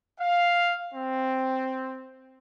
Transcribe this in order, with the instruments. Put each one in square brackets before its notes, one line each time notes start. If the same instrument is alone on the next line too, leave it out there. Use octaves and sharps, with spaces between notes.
[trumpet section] F5
C4